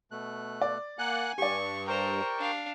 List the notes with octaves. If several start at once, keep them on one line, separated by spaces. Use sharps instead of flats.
B2 A3 F#6
D5
A#3 F#5 G#5 F#6
G2 G4 D5 C#6
A#4 C5 G5 A#5 C#6
D4 F5